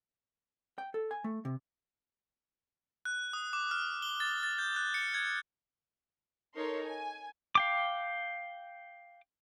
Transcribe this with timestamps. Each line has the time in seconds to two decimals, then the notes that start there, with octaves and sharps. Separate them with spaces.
0.78 G5
0.94 A4
1.11 G#5
1.24 A3
1.45 C3
3.05 F#6
3.33 D#6
3.53 D6
3.71 F6
4.02 G7
4.20 A6
4.43 A6
4.59 G6
4.76 F#6
4.94 C#7
5.14 G#6
6.55 D#4 A4 A#4 C#5 C6
6.84 G#5
7.55 F5 G5 D6